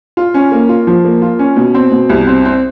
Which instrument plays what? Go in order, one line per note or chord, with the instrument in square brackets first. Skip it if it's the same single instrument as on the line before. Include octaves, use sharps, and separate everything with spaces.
[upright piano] F4
C#4
A#3
F4
F3
A#3
F4
C#4
B2
C4
B2
C2
C4
C4